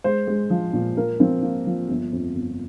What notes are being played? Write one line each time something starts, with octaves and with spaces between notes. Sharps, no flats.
G#3 C5
G#3
F3
A#2
A#3 A#4
F3 C4
A#3
F3
G1
F2
G1